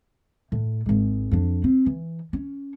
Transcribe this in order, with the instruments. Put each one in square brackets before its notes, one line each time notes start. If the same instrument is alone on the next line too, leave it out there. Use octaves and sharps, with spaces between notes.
[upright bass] A2
G#1 G#3
F2 D4
C4
E3
C#4